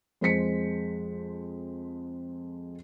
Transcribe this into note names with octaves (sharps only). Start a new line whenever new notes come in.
F2 G#3 C5 B6 C#7